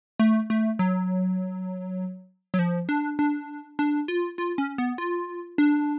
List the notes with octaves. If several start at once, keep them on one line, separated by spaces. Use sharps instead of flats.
A3
A3
F#3
F#3
F3
D4
D4
D4
F4
F4
C#4
B3
F4
D4